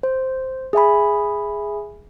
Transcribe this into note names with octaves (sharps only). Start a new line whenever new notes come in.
C5
G#4 E5 G#5 B5